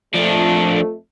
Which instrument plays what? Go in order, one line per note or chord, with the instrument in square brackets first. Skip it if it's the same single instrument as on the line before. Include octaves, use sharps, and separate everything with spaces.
[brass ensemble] F2 A3 [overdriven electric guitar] F3 D4